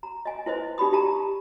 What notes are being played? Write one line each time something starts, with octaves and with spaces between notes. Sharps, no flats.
A#5
D#5 G#5
E4 B4 C5 D#5
D#4 G4 D5 B5 D#6
G4 A5 A#5